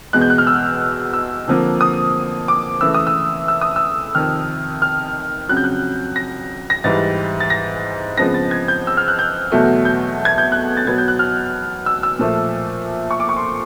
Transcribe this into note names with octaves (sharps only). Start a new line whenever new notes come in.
E2 B2 G#3 F#6
G6
F#6
F6
E6
E6
F2 D3 F3 A#3
D#6
D6
C#3 E3 A3 E6
D#6
E6
E6
D#6
E6
F2 C3 D#3 F6
F6
F2 C#3 F#3 F#6
G6
F#6
A#6
A#6
G#2 E3 G3 A6
A6
A#6
F2 C#3 F3 G#3 B3 A#6
A6
G#6
G6
E6
F6
F#6
G6
E2 B2 F#3 A3
G6
G#6
G6
F#6
A6
B2 F#3 B3 G#6
G6
F#6
F6
E6
E6
A#2 F3 A3
C#6
D6
C#6
C6